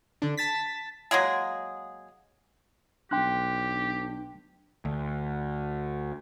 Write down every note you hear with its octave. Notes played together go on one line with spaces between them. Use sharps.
D3 D4
A5 A6 B6
F#3 G#3 A#3 G#4
B1 D4 G4 G5 C6 F#6
D2